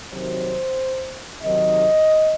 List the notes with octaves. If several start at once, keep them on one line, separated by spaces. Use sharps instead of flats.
C3 D#3 F#3 C5
C3 D#3 F#3 D#5